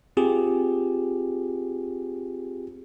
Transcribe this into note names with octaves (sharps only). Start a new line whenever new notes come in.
C4 F4 G4 G#4